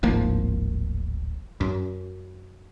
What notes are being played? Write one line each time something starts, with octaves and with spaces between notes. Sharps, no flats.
D1 G#1 F3 A#3
F#2